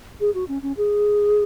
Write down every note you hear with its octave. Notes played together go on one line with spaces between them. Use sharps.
G#4
F#4
C#4
C#4
G#4